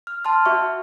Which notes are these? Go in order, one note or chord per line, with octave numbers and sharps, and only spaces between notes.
F6
A5 C6 F6
F#4 E5 C#6